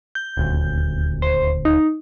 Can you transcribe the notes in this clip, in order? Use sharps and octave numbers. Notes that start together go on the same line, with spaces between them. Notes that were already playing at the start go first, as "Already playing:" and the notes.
G6
D#1 D2
C5
D#4